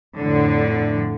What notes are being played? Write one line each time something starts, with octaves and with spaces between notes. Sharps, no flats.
F2 A2 D3